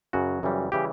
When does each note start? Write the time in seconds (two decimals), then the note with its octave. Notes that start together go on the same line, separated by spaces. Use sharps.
0.13 F#2 C#3 F#3 F#4
0.43 F#2 C#3 E3 G3
0.72 C#3 E3 G3 G4